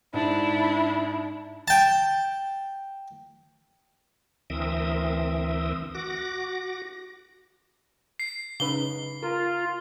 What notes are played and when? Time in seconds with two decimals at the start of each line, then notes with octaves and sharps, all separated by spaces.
0.14 G#2 D4 E4
1.68 G5 A5
4.50 D2 E3 C4 A#4 E5 D#6
5.95 F#4 D6 A#6
8.20 C7
8.60 C#3 D#4 B4 G7
9.23 F4 A#4